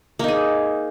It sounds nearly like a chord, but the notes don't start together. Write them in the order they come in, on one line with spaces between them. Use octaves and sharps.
A#3 D#4 G#4